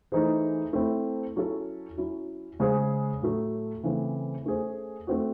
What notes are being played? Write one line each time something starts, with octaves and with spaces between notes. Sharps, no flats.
E3 A3 D#4 G#4 C5
A3 C4 E4
F#3 C#4 E4 A4
F#3 C#4 E4
C#3 G#3 C#4 G#4 C5
A2 F#3 A3
C#3 E3 A3 C4
A3 C#4 G#4 C5
A3 C4 F#4